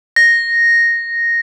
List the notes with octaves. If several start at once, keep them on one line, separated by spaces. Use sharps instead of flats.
A#6